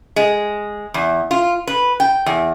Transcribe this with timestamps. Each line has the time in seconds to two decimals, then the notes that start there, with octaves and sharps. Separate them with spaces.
0.16 G#3
0.94 E2
1.31 F4
1.67 B4
2.00 G5
2.26 E2